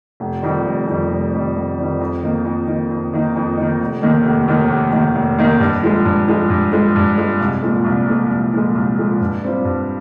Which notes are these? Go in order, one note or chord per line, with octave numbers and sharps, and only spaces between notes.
F1
F2 D#3 G3
F1
F2 D#3 G3
F1
F2 D#3 G3
F1
F2 D#3 G3
F2
D#3 A#3 D#4
F2
D#3 A#3 D#4
F2
D#3 A#3 D#4
F2
D#3 A#3 D#4
F1
D#2 D#3 A#3
F1
D#2 D#3 A#3
F1
D#2 D#3 A#3
F1
D#2 D#3 A#3
G2
F3 G#3
G2
F3 G#3
G2
F3 G#3
G2
F3 G#3
C2
A#2 F3 G#3
C2
A#2 F3 G#3
C2
A#2 F3 G#3
C2
A#2 F3 G#3
G2
G3 C4 F4
G2